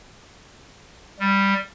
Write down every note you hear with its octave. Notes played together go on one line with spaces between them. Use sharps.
G3